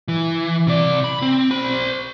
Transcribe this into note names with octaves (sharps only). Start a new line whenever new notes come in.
E3
C3 D5
B5
C4
C5 B5